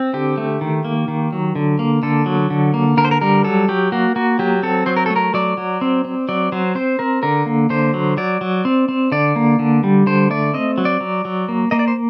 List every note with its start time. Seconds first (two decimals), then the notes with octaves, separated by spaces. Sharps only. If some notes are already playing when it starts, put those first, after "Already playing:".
Already playing: C4
0.13 D3 G4
0.38 A3
0.61 D#3
0.85 A#3
1.08 D#3
1.32 F#3
1.55 D3
1.79 A#3
2.03 D3 A4
2.26 F#3
2.50 D3
2.74 A#3
2.97 D3 A#4
3.05 C5
3.11 A#4
3.21 G3 A#4
3.44 F#3 A4
3.69 F#3 G4
3.92 A#3 F#4
4.16 A#3 F#4
4.39 F#3 G4
4.63 C4 A4
4.86 F#3 C5
4.96 A#4
5.06 A3 A4
5.16 A#4
5.34 F#3 D5
5.57 F#3
5.81 C4
6.05 C4
6.29 F#3 D5
6.52 F#3 C5
6.75 C4 C5
6.99 C4 A#4
7.23 D3 A#4
7.46 A#3
7.70 D3 C5
7.94 F#3
8.17 F#3 D5
8.41 F#3
8.65 C4
8.89 C4
9.12 D3 D5
9.36 A#3
9.59 D3
9.83 G3
10.06 D3 C5
10.30 A3 D5
10.54 C4 D#5
10.78 F#3
10.85 D5
11.01 F#3
11.25 F#3
11.48 A#3
11.71 A#3 D#5
11.79 D5
11.88 C5